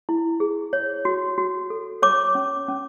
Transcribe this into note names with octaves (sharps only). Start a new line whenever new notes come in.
E4
G#4
C#5
F#4
F#4
A4
C#5 D6
C#4
C#4